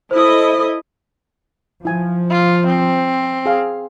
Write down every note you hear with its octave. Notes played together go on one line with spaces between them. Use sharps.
E4 A4 C5 D#5
F3 E4 G#5
F4
C4
G#4 F5